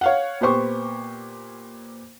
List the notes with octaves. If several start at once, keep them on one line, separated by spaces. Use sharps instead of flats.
C#5 F5 F#5
A#2 B3 G4 C5 C#6